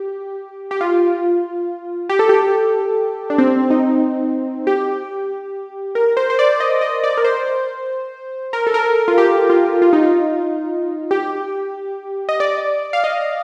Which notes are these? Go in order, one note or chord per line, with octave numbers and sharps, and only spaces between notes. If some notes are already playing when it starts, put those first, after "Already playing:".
Already playing: G4
G4
F4
G4
A4
G4
D4
C4
D#4
G4
A#4
C5
C5
D5
D#5
D#5
D5
A#4
C5
A#4
A4
A#4
F4
G4
F4
F4
D#4
F4
G4
D#5
D5
F5
D#5